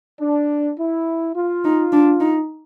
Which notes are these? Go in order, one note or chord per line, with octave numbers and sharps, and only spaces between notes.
D4
E4
F4
D#4
D4
D#4